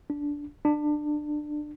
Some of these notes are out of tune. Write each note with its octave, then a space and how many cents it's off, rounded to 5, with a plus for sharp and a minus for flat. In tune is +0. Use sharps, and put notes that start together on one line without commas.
D4 -10
D4 +25